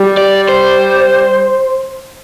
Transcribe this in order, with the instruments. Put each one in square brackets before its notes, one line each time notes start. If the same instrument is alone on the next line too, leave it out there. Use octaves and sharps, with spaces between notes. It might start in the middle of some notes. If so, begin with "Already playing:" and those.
Already playing: [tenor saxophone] G3
[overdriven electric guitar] D5
C5